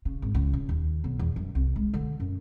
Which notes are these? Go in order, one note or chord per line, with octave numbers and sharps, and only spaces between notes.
C#3
G#1
C#2
C#3
D#2
B1
E2
F#2
C2
G#3
D3
F#2